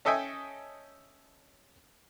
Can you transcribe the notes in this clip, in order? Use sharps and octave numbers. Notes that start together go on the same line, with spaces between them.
C#4 A4 D#5 E5 G5 G#5